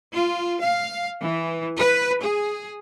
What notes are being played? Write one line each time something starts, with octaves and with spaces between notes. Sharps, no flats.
F4
F5
E3
B4
G#4